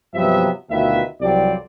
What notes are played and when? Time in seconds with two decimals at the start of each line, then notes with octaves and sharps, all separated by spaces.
0.14 G2 C3 F3 F#3 B3 E5
0.70 D2 B2 D#3 F4 B4 E5
1.21 C2 F2 F#3 G3 C4 D5